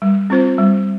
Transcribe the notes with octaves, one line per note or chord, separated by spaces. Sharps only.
G3
C4 F4 C5
G3